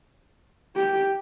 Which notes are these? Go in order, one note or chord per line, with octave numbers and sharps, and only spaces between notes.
G4